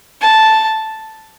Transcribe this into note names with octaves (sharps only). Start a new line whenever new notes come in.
A5